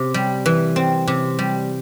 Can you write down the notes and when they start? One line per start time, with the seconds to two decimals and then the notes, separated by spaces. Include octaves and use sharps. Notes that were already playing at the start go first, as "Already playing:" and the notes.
Already playing: C3 C4
0.14 G3
0.46 E3
0.76 C4
1.07 C3
1.39 G3